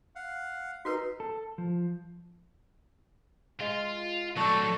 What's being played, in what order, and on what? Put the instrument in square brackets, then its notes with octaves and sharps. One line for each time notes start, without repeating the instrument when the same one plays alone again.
[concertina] F5 F#5
[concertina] D#4 C6 [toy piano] F#4 A#4 B4
[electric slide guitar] A4
F3
[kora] G#3 [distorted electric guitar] F4
[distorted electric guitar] F#3 A3 [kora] D4 [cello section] A4 [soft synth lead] C#6